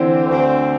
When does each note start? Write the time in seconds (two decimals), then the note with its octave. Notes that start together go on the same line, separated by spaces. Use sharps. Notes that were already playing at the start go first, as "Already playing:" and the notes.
Already playing: D3 E3 C4
0.28 D2 D3 C4